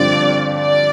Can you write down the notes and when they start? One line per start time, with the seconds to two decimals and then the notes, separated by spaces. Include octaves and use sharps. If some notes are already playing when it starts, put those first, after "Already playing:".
Already playing: G2 D3 F3 C4 D5
0.59 D5